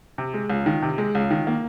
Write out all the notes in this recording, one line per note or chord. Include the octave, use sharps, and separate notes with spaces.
C3
G#3
C#2
D#3
C3
G#3
C#2
D#3
A#3